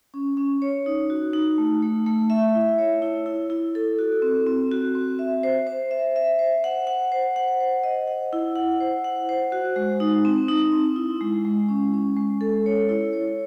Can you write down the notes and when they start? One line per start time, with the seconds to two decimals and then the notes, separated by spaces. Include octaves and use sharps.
0.14 C#4
0.37 C#4
0.62 C#5
0.86 D#4
1.10 F#4
1.33 D#4
1.58 A3
1.82 A3
2.06 A3
2.30 E5
2.55 E4
2.78 C#5
3.02 E4
3.26 E4
3.50 E4
3.75 A4
3.99 F#4
4.22 C4
4.46 C4
4.71 F#4
4.95 C4
5.19 E5
5.43 C5
5.67 C5
5.91 E5
6.16 E5
6.39 C5
6.64 F#5
6.87 F#5
7.12 C5
7.36 F#5
7.60 C5
7.83 D#5
8.08 F#5
8.33 E4
8.56 F#5
8.80 C5
9.04 F#5
9.29 C5
9.52 F#4
9.76 G#3
10.00 D#4
10.25 C4
10.48 D#4
10.72 C4
10.96 E4
11.21 G#3
11.45 G#3
11.69 C#4
11.94 C#4
12.17 G#3
12.41 A4
12.66 C#5
12.89 E4
13.13 C#5